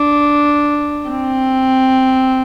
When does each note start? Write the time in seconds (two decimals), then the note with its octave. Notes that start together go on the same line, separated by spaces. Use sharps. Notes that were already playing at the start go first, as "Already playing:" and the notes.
Already playing: D4
1.09 C4